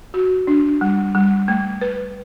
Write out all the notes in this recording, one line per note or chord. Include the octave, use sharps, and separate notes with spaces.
F#4
D4
G3
G3
A3
B4